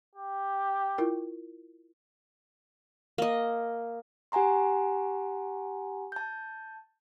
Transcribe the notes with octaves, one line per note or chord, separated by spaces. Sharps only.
G4
E4 F4 A#4
A#3 D#5
G4 F#5 G#5 A#5 C6
A5 G6